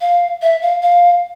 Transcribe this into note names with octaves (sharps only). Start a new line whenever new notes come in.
F5
E5
F5
F5